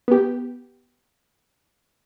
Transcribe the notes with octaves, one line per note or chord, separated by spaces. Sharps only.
B3 G4